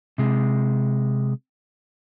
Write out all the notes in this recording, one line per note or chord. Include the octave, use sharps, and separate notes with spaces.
C3 G#3